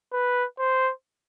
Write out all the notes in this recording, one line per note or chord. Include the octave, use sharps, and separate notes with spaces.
B4
C5